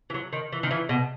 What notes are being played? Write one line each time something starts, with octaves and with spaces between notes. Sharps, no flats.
E3
F#3
D#3
E3
D#3
E3
B2